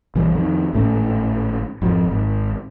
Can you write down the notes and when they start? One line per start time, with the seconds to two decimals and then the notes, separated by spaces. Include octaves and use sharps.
0.15 A#1 E3 G3
0.32 F2 D#3
0.73 G#1 A2 A3 C#4
1.82 G#1 F2 C3 F3
2.10 G#1